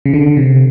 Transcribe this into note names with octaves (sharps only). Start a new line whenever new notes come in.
C#3
D3
C3